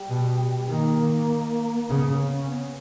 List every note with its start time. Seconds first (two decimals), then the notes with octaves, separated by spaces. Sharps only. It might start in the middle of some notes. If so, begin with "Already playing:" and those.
Already playing: G3
0.09 B2
0.68 D#3 A#3
1.89 C#3 B3
2.10 C#4
2.30 C#4
2.49 B3